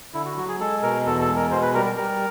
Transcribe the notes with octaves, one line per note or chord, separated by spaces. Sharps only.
D3 E4
F#4
F#3 F#4
G#4
G#3 A4
B2 A#4
E2 A4
A4
G#3
A#4
B2 C5
B4
G3 A#4
A#4
G3 A#4